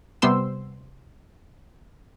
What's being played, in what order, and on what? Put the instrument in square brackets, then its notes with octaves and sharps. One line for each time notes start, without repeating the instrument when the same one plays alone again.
[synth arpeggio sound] C3 G3 B3 C5 C6 E6